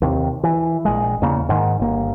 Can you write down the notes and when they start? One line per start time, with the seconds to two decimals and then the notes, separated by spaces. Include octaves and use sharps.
0.02 D#2 C3
0.43 E3
0.85 A#1 G#3
1.22 E2 C#3 A#3
1.49 G#2 D#3
1.80 G1 A#3